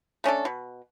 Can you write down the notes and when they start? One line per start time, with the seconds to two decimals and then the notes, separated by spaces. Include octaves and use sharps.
0.24 A3 C#4 D4 A4
0.45 B2